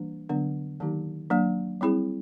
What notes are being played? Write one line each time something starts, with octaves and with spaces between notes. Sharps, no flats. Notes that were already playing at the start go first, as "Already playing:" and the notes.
Already playing: E3 G3 A#3 D4
D3 F#3 B3 D4
D#3 F#3 A#3 D#4 G4
F#3 A#3 D4
G3 C4 E4 G#4